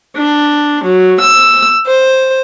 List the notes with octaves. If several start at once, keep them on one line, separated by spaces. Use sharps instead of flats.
D4
F#3
E6
C5